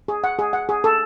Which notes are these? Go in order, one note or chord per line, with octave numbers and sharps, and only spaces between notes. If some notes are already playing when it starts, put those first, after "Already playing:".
G#4
F#5
G#4
F#5
G#4
A4